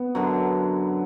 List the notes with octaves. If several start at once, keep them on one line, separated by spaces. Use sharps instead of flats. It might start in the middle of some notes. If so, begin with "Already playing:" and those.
Already playing: B3
F#2 D3 F#3